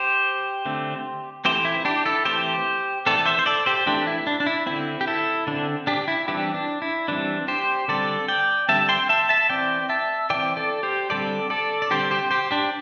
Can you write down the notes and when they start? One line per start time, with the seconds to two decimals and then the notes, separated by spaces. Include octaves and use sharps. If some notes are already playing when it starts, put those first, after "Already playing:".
Already playing: G4 C5
0.65 D3 A3 C4
1.45 E3 A3 C4 G4 C5
1.65 E4
1.85 D4 G4
2.06 E4 A4
2.25 E3 A3 C4 G4 C5
3.06 E3 A3 C4 A4 D5
3.26 C5 E5
3.39 C5
3.46 A4 D5
3.66 G4 C5
3.86 E3 A3 C4 D4 G4
4.07 E4
4.27 D4
4.40 D4
4.46 E4
4.66 D3 C4 E4
5.01 G4
5.07 E4 A4
5.47 D3 C4 D4
5.87 D4 G4
6.08 E4
6.28 E3 G3 C4 D4 G4
6.54 D4
6.82 E4
7.08 E3 G3 C4 D4
7.48 G4 C5
7.88 D3 G3 C4 A4 D5
8.28 D5 G5
8.69 D3 G3 C4 E5 A5
8.89 G5 C6
9.09 E5 A5
9.29 E5 A5
9.49 E3 C4 D5 G5
9.89 E5 A5
10.30 E3 C4 D5 G5
10.57 A4 D5
10.83 G4 C5
11.10 D3 G3 C4 A4 D5
11.50 A4 D5
11.82 D5
11.90 D3 G3 C4 G4 C5
12.11 G4 C5
12.31 G4 C5
12.51 D4 G4